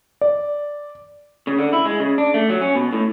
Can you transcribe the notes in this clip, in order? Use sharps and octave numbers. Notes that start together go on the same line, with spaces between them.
D5
C#3
D3
E4
G#3
C#3
D4
A3
F#3
C#4
B2
A2